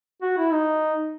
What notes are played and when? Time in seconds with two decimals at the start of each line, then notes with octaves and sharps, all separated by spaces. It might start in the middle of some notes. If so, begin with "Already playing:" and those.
0.22 F#4
0.38 E4
0.52 D#4